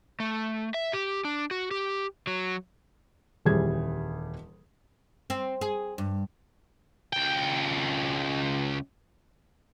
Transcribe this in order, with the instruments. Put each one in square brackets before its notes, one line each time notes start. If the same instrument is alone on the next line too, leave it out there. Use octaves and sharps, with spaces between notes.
[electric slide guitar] A3
E5
G4
D4
F#4
G4
F#3
[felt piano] D#1 F2 E3 G3 G#4 G#6
[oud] C4
G#4
G2
[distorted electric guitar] C#2 G5